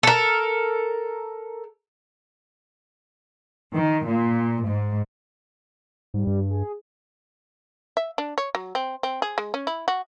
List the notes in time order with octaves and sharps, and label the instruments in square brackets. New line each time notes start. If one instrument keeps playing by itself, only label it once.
[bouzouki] A4 A#4
[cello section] D#3
A#2
G#2
[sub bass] G#2 [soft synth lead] G3
[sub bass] G2
[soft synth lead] G#4
[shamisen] E5
D4
C#5
F#3
C4
C4
G#4
G#3
C#4
E4
F#4